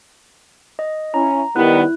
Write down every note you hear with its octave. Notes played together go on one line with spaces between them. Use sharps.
D#5
C#4 E4 A#5
D#3 G3 B3 E4 F#6